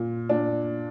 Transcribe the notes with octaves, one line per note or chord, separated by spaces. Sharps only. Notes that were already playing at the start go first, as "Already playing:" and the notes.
Already playing: A#2
A#2 D4